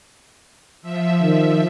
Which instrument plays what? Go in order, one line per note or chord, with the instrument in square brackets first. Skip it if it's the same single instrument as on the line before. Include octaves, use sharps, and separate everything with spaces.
[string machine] F3 E5
[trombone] D#3